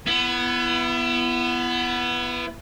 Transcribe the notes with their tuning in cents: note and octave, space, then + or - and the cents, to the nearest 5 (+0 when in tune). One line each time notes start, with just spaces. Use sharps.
B3 +0 E4 +35